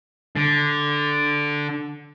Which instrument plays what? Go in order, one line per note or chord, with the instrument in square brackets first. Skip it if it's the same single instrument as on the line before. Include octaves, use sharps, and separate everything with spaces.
[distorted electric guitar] D3